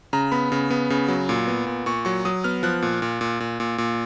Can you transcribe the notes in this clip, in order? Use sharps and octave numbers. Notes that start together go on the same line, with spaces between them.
C#3 A#5
B3 B5
C#3
B3
C#3
F#3
A#2
B3
A#2
A#2 C#6
F#3 C#6
F#3 D#6
B3 F6
F3 F#6
A#2
A#2
A#2
A#2
A#2
A#2